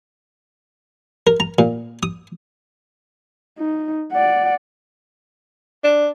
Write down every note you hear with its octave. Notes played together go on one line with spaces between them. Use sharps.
A#4
A#5
A#2
D#6
D#4
D5 F#5
D4